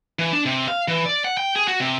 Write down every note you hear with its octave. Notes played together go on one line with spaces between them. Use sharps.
E3
D4
C3
F5
E3
D5
F#5
G5
G#4
F#4
C3